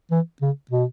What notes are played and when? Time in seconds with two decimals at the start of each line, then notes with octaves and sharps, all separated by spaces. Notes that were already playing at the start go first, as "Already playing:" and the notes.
0.11 E3
0.42 C#3
0.71 B2